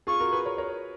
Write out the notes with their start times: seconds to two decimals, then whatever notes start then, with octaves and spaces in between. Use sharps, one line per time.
0.07 F4 G#4 C#6
0.20 F#4 A#4
0.32 G#4 B4
0.45 A#4 C#5
0.58 A#4 C#5